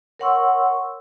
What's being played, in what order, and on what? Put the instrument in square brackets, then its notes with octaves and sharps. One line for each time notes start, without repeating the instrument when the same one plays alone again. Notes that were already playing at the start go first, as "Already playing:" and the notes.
[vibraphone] A#4 C#5 F#5 C6 C#6 E6